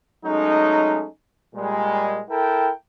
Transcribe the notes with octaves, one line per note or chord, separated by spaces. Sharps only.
F#3 G#3 A3 C#4 D#4
A#2 G3 G#3
E4 A4 A#4 G5